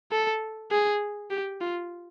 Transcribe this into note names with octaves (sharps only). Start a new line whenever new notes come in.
A4
G#4
G4
F4